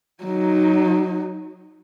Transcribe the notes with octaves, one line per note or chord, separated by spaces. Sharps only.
F#3 D#4